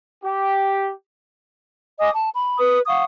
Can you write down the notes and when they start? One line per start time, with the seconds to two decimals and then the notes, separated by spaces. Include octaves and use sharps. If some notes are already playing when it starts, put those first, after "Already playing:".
0.24 G4
2.00 D#5 G#5 D6 D#6
2.13 A5
2.33 B5
2.58 B4 D#6
2.86 F5 F#5 C#6 D#6